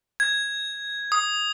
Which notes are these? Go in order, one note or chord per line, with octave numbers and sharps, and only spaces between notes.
G#6
D#6